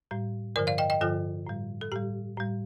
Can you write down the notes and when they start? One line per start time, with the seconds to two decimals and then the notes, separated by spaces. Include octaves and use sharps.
0.11 A2 G3
0.56 G2 D3 F3 A#4 D5
0.67 D5 F5
0.78 D#5 G5
0.90 D#5 G5
1.01 G2 D3 F3 F4 A4
1.46 A2 G3
1.81 A4
1.92 A2 G3 G4
2.37 A2 G3